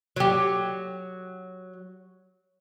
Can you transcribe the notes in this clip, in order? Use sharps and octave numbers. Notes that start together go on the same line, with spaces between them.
F#3 G4